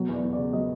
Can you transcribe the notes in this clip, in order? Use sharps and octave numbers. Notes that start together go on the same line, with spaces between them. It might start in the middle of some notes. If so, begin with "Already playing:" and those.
Already playing: B2 F#3
E2 D5
E2
D5
C#3
F#3 D#5